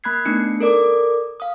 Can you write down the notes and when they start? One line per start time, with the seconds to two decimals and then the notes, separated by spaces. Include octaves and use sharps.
0.04 A#3 B5 F#6 G#6 C7
0.25 A3 B3 D4 D#4 C7 C#7
0.60 A4 A#4 D5 D6
1.40 F5 D#6